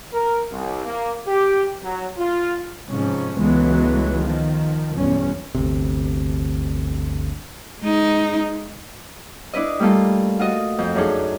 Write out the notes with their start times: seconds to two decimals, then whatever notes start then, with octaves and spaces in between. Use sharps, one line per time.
0.13 A#4
0.51 C2
0.85 A#3
1.27 G4
1.83 F#3
2.18 F4
2.89 G#2 C3 F3 C#4
3.37 C#2 E3 F#3 G#3 A3 B3
4.21 D#3 F3
4.96 B1 E2 G2 C#4
5.55 G1 D2 C3
7.80 G#3 D#4
9.53 D4 E4 B4 D#5
9.80 G3 A3 A#3 F4 A4
10.39 F4 F#4 D#5
10.79 F2 G6
10.95 F#2 D4 D#4 G#4 A4